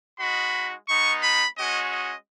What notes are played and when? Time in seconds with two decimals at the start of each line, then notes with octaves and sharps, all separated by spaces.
0.19 G#3 D#4 F#4 B5
0.89 G#3 B3 D#4 C#6
1.23 B5
1.57 G#3 C#4 F#4 D#5
1.92 D#5